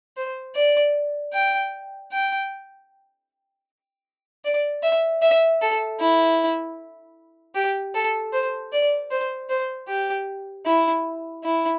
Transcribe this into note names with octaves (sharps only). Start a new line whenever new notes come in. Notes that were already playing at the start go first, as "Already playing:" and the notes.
C5
D5
G5
G5
D5
E5
E5
A4
E4
G4
A4
C5
D5
C5
C5
G4
E4
E4